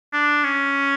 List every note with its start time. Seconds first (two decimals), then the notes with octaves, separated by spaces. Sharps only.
0.13 D4
0.44 C#4